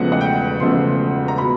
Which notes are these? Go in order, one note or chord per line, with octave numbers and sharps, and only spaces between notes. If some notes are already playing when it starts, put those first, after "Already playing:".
Already playing: E1 E2 C#3 F3 A3 F#5
F#5
G5
E1 E2 C#3 F3 A3 C6
A#5
B2 B5